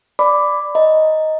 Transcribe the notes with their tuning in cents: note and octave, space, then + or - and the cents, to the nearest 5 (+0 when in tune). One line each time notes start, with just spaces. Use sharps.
D5 +0 B5 +15 D6 +0
D#5 +10 A#5 +0